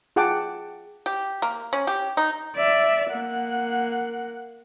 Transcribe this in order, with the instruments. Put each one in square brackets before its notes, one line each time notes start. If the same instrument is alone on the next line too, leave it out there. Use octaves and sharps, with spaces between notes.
[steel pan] F4 G#4 F#5 G5 A5 D6
[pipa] G4
A#3
C#4
G4
D#4
[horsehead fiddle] D5 E5
A#3 F#5